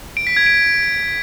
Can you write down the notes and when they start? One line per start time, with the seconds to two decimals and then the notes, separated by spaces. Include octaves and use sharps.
0.17 D7
0.27 B6
0.37 G#6
0.46 D7